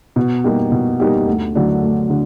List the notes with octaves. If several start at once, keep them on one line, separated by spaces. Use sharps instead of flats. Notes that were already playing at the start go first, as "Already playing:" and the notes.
B2
G3 A#3 D#4 G4
B2
G3 A#3 D#4 G4
D2
D3 F#3 A3 D4
D2
D3